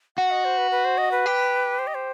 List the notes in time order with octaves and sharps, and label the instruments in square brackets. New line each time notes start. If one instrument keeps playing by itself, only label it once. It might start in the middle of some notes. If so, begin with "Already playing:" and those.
[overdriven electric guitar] F#4 [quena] F#5
[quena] D#5
C5
B4
B4
C5
D#5
B4
[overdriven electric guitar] G4
[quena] C5
D#5
C5